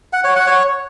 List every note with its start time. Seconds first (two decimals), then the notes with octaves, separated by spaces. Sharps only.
0.13 F#5
0.24 C#5
0.35 F#5
0.47 C#5